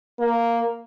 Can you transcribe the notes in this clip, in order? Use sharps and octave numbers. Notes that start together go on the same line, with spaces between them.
A#3